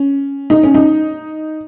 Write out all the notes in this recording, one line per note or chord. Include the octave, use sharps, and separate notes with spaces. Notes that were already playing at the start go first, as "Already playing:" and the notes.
Already playing: C#4
D#4
C#4
D#4